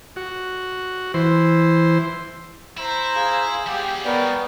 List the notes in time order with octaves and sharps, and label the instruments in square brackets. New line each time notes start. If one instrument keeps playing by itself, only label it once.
[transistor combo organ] F#4
E3 C5
[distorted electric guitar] E4 [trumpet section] C5 A#5
[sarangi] G#4 [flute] F5
[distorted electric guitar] G3 F#5 [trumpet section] G4
[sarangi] B3 [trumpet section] A#4 C#5 G5 [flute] D5